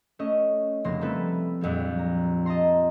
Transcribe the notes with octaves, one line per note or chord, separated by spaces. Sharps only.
A3 C#4 D#5
F1 C#3 A#3 C6 A#6
G3 A3 C4 E4 A4 B4
A#1 F2 F#3 G3
A#5
D#5 A5 A#5 C6